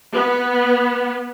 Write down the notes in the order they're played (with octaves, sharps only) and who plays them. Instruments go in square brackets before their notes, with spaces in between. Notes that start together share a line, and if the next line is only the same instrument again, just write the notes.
[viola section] B3